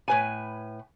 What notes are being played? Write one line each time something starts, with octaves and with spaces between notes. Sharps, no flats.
A2 B4 G#5